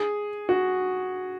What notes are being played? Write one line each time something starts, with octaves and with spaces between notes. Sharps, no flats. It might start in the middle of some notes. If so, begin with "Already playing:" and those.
Already playing: G#4
F#4